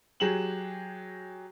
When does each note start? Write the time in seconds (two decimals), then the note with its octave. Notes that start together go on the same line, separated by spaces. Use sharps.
0.20 F#3 G4 G#4 E7 F#7